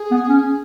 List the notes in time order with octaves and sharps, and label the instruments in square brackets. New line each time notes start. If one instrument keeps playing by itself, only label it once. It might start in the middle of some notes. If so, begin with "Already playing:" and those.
Already playing: [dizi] G#4
[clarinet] B3
C#4